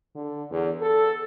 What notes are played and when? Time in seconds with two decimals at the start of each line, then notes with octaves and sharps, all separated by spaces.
0.15 D3
0.51 E2
0.82 A4